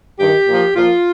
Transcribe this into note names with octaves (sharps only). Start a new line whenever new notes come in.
G2 D#3 G4
A#2 F3
A#2 F3 F4